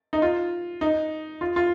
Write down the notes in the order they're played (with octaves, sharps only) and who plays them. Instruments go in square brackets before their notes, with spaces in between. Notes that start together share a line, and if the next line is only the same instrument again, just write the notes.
[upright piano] D#4
F4
D#4
F4
F4